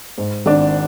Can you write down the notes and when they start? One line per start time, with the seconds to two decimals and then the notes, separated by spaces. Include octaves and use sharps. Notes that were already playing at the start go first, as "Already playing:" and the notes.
0.18 G#2
0.46 G#1 D4